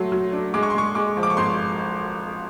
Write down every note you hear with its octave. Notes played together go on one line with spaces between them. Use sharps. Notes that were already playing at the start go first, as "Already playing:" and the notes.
Already playing: F#3 A3 C6
F#3
D4
G#3 D6
C#6
C6
G#3 C#6
G#3 D6
F3
D6
C#6
G#1 C6